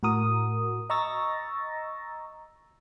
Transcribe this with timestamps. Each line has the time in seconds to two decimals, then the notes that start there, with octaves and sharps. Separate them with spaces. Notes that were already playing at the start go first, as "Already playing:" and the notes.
0.03 A2 F#4 A#4 D#6
0.90 D#5 A#5 C#6 E6 A6 A#6